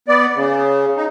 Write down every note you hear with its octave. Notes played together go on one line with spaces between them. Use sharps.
B3 D5
C#3
D#4